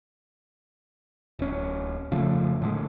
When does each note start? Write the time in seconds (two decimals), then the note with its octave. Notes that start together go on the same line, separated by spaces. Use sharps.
1.39 D1 C#4
2.11 F1 C#3 F3 A3
2.62 A2 D3 G#3